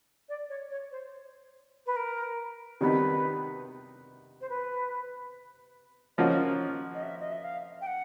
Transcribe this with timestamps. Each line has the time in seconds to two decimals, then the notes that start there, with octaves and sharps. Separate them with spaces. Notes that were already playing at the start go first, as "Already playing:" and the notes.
0.28 D5
0.49 C#5
0.70 C#5
0.91 C5
1.86 B4
1.96 A#4
2.80 C3 D#3 G3 B3 D#4 B4
4.41 C5
4.49 B4
6.17 F3 A#3 C#4 F#4 D#5
6.94 D#5
7.02 E5
7.20 D#5
7.31 E5
7.43 F5
7.81 G5
7.86 F#5